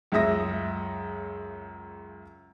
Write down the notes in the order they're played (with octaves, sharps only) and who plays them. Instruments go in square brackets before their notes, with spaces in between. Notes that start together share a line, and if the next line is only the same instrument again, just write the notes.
[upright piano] C#2 F#2 C#3 E5 D#6 A#6